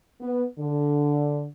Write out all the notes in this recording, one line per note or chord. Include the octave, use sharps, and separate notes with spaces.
B3
D3